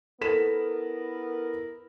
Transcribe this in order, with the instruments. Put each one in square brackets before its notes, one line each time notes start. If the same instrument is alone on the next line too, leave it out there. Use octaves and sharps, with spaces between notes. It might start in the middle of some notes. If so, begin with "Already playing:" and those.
[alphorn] B3 [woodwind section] E4 A#4 [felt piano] A4 B6 E7